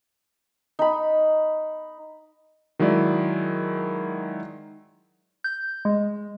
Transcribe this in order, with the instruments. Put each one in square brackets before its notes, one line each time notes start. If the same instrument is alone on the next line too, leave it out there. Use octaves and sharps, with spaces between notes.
[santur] D#4 B5
[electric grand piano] D#3 F#3 G#3 E4 D5
[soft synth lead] G6
G#3